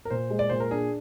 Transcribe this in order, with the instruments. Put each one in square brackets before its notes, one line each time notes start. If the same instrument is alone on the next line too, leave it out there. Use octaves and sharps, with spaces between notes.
[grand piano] A#4
[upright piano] A#2 [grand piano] C5
[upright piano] G#3
[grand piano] D5
[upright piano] A#2 [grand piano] C5
[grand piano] A#4
[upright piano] D4 [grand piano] G#4